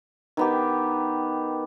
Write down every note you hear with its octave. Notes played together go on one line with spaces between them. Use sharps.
D#3 B3 G4